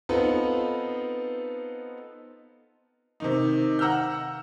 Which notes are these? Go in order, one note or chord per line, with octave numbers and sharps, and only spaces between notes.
B3 C4 D#4 F4 A4 B4
C3 D#3 D#4
F#5 A#5 E6 F6 G6